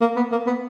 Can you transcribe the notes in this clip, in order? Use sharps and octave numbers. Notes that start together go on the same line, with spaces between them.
A#3
B3
A#3
B3